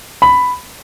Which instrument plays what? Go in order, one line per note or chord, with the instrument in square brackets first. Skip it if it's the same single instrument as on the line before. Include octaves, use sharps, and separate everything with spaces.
[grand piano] B5